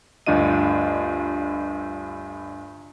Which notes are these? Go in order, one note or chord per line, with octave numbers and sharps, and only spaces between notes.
D2 G2 D4 F4 D#5 D#7